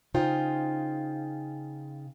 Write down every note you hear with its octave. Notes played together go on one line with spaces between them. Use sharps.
C#3 D#4 F4 C5 G5